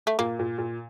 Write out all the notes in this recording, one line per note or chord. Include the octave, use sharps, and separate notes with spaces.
A3
A#2 A#3
A#2
A#2